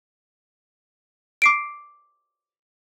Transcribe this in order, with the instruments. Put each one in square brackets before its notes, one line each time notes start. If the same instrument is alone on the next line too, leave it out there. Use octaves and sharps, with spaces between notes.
[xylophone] D6 C7 D7